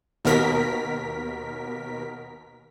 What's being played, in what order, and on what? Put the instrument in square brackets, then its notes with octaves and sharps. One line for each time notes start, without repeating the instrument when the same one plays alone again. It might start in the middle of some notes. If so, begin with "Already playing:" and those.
[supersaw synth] D#2 B2 A#4 B6